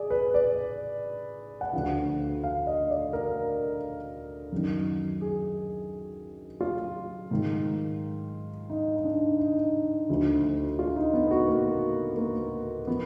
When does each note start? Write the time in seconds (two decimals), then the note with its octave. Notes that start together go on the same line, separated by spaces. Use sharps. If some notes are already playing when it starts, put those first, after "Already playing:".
Already playing: G#4 D5
0.10 B4
0.34 D5
1.61 F#5
1.73 D2 D3 F3 F5
2.44 F5
2.67 D#5
2.90 D5
3.13 A#4
4.52 F#2 D#3
5.21 G#4
6.61 F4
7.31 G#2 D#3
8.70 D#4
8.96 D#4
9.04 D4
9.39 D#4
10.09 D2 D3 F3
10.79 F4
10.96 D#4
11.14 B3
11.31 F#4
11.48 A#3
12.17 A#3
12.87 F3 B3